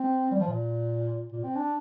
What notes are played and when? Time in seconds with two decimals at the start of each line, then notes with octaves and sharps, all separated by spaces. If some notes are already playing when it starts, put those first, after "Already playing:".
Already playing: C4
0.31 G3
0.40 F3
0.47 A#2
1.32 A#2
1.43 C4
1.56 D4